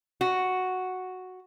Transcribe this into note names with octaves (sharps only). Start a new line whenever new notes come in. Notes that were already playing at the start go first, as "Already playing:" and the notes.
F#4